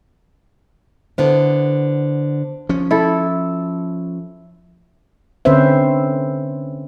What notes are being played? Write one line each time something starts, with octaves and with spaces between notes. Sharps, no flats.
D3 B3 E4 C5
F3 C#4
E4 A4
D3 C4 C#4 B4 C5 E5